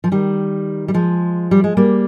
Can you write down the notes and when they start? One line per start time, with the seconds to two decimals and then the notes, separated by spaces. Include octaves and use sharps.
0.04 F3
0.12 D#3 G3
0.88 G3
0.94 F3 G#3
1.51 G3
1.64 G#3
1.77 G3 A#3